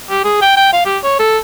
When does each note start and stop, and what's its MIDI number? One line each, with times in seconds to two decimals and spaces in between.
0.10 0.24 67
0.25 0.40 68
0.42 0.54 79
0.57 0.71 79
0.73 0.85 77
0.86 0.98 67
1.03 1.14 73
1.19 1.38 69